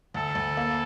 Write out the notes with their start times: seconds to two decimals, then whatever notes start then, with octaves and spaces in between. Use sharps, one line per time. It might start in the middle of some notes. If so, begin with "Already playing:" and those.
0.14 D2 A4
0.35 D2
0.57 A#3